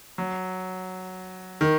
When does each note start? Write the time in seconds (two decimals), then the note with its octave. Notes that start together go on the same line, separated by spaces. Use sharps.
0.18 F#3
1.61 D#3